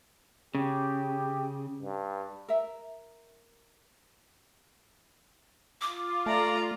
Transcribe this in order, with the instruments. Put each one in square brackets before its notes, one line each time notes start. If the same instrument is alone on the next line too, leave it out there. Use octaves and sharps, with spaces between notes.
[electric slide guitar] C#3 [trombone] G4
[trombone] G2
[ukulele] A#4 E5
[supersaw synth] F4 [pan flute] D6
[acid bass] A3 [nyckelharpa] D5 A#5